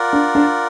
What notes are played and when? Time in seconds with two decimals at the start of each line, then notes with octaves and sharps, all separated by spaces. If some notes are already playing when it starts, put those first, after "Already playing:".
Already playing: F4 A#4 D5 F#5
0.13 D4
0.35 D4